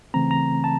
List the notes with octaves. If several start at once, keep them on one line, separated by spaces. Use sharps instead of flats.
C#3 E3 A3 C4 A#5
A#5
A5